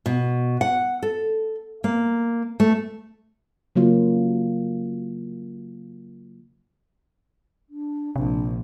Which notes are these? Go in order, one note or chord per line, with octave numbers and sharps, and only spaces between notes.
B2
F#5
A4
A#3
A3
C#3 F#3 A#3 F4
D4
A#1 C3 D4